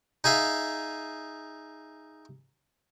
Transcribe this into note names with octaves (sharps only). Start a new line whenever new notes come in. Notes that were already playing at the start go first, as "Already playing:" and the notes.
D#4 G#4 E5 F5